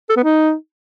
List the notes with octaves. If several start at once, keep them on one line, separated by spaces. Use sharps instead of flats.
A4
B3
D#4